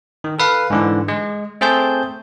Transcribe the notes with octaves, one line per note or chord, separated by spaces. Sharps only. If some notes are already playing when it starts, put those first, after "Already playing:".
D#3
A4 B4 F5
G#2 D3 E3
G#3
A3 C4 G#4 C5 A5 G6